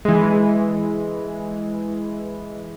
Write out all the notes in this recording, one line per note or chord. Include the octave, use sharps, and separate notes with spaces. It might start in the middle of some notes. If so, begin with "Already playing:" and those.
E3 G#3